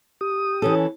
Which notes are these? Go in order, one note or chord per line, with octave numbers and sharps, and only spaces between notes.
G4 D#6
E3 C#4 A4